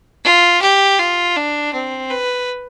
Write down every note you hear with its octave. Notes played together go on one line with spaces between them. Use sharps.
F4
G4
F4
D4
C4
B4